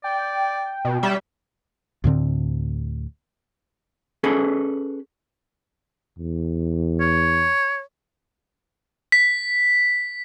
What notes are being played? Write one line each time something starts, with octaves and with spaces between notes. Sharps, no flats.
D5 G5
B2
G3 C#4 E5
D2 A2 D3 C4
C#4 G#4 A4 B4
E2
C#5
B6